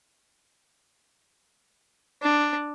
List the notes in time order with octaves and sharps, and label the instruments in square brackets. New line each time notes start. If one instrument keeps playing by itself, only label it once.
[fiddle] D4